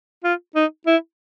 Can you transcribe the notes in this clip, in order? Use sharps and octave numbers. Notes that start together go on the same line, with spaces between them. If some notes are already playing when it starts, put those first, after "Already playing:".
F4
D#4
E4